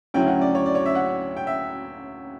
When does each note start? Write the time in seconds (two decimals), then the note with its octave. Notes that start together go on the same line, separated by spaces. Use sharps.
0.14 D2 C#3 F#3 C#4 E4 G5
0.28 F#5
0.41 D5
0.55 C#5
0.66 D5
0.75 C#5
0.86 E5
0.95 F#5
1.37 G5
1.47 E5